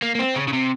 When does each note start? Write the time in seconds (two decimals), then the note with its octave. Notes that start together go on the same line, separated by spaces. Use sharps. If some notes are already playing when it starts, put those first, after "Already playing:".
0.02 A#3
0.15 A#3
0.19 C4
0.36 C#3
0.48 C#3
0.53 C3